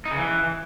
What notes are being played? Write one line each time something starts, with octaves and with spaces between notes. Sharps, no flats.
D#4
C#3
E3